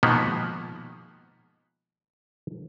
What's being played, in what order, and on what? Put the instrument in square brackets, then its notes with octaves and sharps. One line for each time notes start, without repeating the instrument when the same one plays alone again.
[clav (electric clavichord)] B2 D#3 F3 G#3 A#3 B3